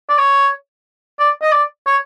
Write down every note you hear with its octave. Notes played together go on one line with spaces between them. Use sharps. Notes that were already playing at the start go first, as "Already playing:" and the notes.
D5
C#5
D5
D#5
D5
C#5